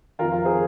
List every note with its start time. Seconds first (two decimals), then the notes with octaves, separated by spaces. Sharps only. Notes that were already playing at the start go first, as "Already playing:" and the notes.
0.19 D#3 F4 A#4
0.23 F2
0.32 F4 A#4
0.45 G#4 C5